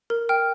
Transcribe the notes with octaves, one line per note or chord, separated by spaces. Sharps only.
A#4
G5 F6